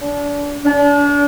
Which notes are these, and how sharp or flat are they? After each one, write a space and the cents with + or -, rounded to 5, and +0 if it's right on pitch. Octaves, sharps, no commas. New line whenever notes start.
D4 -30
D4 -35